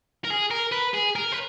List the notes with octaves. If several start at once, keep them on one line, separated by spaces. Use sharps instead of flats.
A#4
G#4
A#4
B4
G#4
A#4
B4